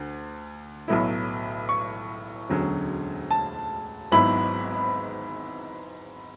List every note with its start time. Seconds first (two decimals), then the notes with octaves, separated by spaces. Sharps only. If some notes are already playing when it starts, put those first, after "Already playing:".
Already playing: D2 D3
0.88 B1 A2 F#3 B3 E4
1.69 C#6
2.49 E1 D2 D3 F#3 C#4
3.31 A5
4.12 G#1 G#2 F#3 B3 E4 B5